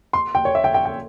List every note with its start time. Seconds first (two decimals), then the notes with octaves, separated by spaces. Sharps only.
0.13 C6
0.35 G5
0.45 C#5
0.55 E5
0.64 G5
0.74 G5
0.85 G5